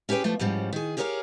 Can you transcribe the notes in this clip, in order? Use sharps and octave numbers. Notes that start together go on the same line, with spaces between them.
C#4 G4 G#4 B4 G5
F3 G3 A3
G#2 F3 G3 C#4
D#3 G#4
G4 G#4 A#4 C#5 D5 F5